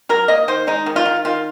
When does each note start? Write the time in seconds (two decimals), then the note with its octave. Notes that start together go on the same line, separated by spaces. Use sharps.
0.09 F#3 A#4
0.28 A#3 D#5
0.48 D#3 C5
0.67 G#3 D#4
0.86 D#3
0.96 F4
1.05 D#3
1.25 D#3 F4